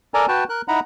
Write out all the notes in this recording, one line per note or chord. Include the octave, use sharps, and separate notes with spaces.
A4 A#4 D5 G#5 A#5
F#4 B4 G5 A5
A#4 F#6
D#4 E4 F#5 A#5 B5